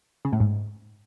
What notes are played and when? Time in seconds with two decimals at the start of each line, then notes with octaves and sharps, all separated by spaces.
0.25 C#3
0.33 A2
0.40 G#2